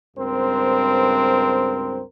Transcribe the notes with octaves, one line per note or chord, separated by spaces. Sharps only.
C#2 G2 C4 A#4 C5